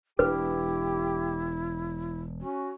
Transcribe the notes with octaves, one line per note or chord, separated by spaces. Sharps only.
E1 D4 E4 G4 B4
C#4 F#4